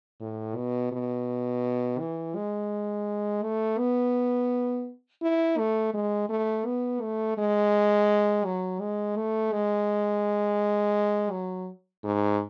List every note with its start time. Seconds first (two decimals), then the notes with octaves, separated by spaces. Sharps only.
0.21 A2
0.56 B2
0.92 B2
1.99 E3
2.36 G#3
3.43 A3
3.78 B3
5.22 E4
5.58 A3
5.94 G#3
6.29 A3
6.66 B3
7.01 A3
7.38 G#3
8.45 F#3
8.81 G#3
9.17 A3
9.53 G#3
11.31 F#3
12.04 G#2